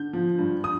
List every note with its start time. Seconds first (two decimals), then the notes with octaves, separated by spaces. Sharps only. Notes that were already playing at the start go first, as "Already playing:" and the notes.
Already playing: D3 G6
0.13 F3
0.39 G2
0.64 D#6